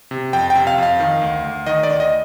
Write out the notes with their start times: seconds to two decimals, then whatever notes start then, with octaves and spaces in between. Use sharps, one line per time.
0.11 C3
0.33 F2 G5
0.50 G5
0.55 C3
0.67 F5
0.78 F2 F5
1.00 D#3
1.22 D2
1.44 D2
1.66 D#3 D#5
1.83 D5
1.89 D2
2.00 D#5